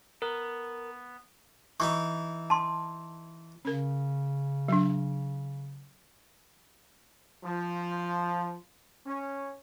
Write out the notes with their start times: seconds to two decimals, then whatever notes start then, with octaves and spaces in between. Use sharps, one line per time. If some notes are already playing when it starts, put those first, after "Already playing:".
0.22 B3 A#4
1.80 E3 D#4 E4 C#6
2.50 A5 C6
3.65 C#3 C#4 A#4
4.68 F#3 D4
7.44 F3
9.06 C#4